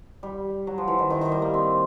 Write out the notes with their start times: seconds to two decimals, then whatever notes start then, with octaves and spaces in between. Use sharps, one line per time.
0.23 G3
0.67 F#3
0.78 F3
0.88 E3
0.99 D#3
1.10 D#3
1.21 D#3
1.32 G3
1.42 A#3
1.54 C4